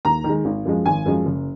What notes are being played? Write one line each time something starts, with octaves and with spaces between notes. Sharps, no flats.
D#2 A#5
D#3 G#3
G#1
F#2 F3 G#3
G#1 G#5
F#2 F3 G#3
F#1